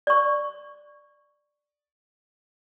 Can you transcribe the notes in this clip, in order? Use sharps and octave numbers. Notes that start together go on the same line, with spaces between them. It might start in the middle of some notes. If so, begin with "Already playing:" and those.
D5 C#6